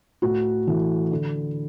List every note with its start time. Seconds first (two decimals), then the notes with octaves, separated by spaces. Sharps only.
0.22 A2 F#4
0.67 E3 A3
1.11 D3